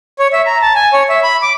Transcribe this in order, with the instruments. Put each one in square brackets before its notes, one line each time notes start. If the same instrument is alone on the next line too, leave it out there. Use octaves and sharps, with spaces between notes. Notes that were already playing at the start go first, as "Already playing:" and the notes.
[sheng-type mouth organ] C#5
E5
A#5
A5
G#5
C#5
E5
B5
D6